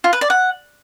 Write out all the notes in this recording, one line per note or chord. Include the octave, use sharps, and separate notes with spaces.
F4
B4
D5
F#5